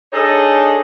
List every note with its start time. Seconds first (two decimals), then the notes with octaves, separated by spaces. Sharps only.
0.13 D4 D#4 G#4 A4 C#5 D#5